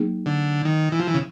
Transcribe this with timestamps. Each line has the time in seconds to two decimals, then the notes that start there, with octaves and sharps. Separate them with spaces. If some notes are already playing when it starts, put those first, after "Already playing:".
Already playing: F#3 A#3 D#4 G#4
0.26 D3
0.65 D#3
0.92 E3
1.00 F3
1.07 E3
1.14 C#3